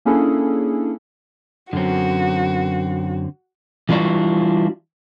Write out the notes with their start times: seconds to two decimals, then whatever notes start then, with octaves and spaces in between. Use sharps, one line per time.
0.05 A#3 C#4 D4 E4 G#4 A4
1.73 F#2 D3 F#3 C4 F#4
3.89 E3 G3 D4 F4 F#4 D5